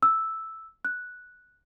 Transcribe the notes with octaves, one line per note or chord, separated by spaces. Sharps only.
E6
F#6